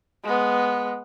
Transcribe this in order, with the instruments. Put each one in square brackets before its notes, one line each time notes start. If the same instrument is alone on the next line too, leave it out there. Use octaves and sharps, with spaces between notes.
[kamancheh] G#3 B3